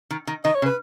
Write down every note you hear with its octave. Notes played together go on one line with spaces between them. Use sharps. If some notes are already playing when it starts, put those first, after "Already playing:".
D#3
D#3
D#3 D#5
C#5
C#3
B4